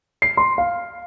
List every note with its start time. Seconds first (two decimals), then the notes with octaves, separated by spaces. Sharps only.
0.22 C7
0.37 C6
0.58 F5